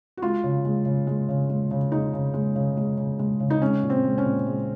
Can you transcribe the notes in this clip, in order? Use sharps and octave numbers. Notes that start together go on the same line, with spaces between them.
F#4
G#3 F4
C#3
G#3
C#3
G#3
C#3
G#3
C#3
G#3 D#4
C#3
G#3
C#3
G#3
C#3
G#3
C#3
D#4
G#3 C#4
A#2
C4
G#3
C#4
A#2
G#3